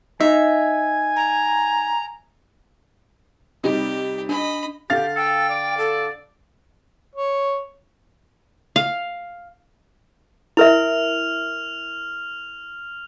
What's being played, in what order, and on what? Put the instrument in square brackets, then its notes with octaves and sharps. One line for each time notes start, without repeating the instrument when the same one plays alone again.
[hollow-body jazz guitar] D#4 [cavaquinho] E5 [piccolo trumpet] G#5
[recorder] A#5
[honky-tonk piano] C3 G3 D#4 [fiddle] G4
[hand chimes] D4 [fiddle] D#5 B5
[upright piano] D3 F5 A6 [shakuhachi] G4
[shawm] A4 [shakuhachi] G5
[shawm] D5
[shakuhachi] A4
[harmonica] C#5
[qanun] F5
[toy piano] E4 A#4 E5 [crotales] F6 F7